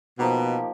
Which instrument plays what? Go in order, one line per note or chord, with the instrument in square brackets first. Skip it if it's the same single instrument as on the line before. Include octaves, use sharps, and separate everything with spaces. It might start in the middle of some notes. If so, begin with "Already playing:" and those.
[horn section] B2 [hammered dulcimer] F3 A#3 D#4 G4